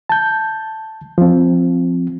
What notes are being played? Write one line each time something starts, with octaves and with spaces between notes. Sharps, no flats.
A5 G6
F3 C4